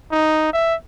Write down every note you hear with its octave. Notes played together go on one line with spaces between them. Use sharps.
D#4
E5